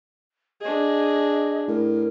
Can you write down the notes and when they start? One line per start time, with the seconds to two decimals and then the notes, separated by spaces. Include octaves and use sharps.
0.61 D4 G#4 D#5
1.68 A2 A#4